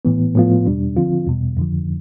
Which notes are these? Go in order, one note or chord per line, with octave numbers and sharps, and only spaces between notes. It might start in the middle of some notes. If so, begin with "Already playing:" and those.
A2 E3 B3
A2 F3 B3 F4
E2 B2 G3 D4
D3 F3 C4 F4
E2 B2 G3
F2 D3 F3